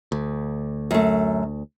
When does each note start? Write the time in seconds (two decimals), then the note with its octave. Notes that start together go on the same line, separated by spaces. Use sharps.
0.12 D2
0.91 F#2 A3